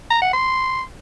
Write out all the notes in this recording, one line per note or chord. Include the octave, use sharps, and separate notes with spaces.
A#5
F#5
C6